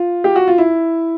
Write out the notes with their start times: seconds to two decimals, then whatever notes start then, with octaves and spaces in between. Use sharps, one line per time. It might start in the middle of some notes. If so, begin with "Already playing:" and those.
Already playing: F4
0.24 G4
0.36 F#4
0.48 F4
0.58 E4